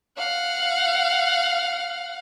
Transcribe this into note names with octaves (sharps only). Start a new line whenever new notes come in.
F5 F#5